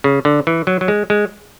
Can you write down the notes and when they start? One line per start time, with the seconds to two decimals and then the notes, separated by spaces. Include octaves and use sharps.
0.04 C#3
0.25 D3
0.47 E3
0.67 F#3
0.81 F#3
0.88 G#3
1.10 G#3